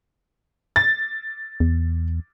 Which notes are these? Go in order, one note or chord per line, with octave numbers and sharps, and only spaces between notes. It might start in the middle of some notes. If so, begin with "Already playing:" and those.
A6
E2